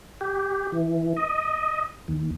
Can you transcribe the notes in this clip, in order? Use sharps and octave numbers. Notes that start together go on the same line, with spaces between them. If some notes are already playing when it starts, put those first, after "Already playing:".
G4
E3
D#5
D#2